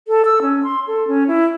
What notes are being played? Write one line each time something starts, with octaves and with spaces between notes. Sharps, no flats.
A4
E6
C#4
C6
A4
C#4
E4